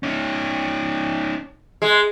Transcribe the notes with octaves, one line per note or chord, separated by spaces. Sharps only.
C#4 D#4
G#3